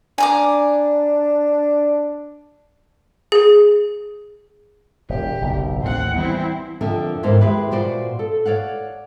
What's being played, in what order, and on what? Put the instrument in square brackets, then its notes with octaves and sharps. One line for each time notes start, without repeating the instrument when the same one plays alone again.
[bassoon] D4 [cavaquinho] G#5 A#5 D6
[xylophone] G#4
[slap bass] E1 A#2 [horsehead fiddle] G4
[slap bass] F#1 B1
[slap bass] A1 D#2 [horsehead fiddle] C4 F#5
[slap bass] E3 G3 B3 [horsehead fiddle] C4 E4
[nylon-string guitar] F2 D3 A#4 E5
D#2 G#2 A#3 E4 C5
G#3 E4 G4 B4
A#2 F#4 C5 D5
A4
C#5 D5 F5 F#5